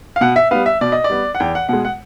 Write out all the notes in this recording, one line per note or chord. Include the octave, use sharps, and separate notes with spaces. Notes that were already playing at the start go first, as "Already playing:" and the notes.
F5
B2 F#5
E5
G3 B3 F5
E5
B2 D5
D#5
D5
G3 B3
F#5
E2 G5
F#5
B2 G#3 F#5
F#5